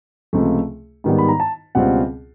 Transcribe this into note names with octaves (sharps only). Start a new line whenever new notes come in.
C#2 C3 F3 A3
G#2 D#3 G3 B3
B5
A#5
A5
C#2 B2 G3 C4 F4 F#5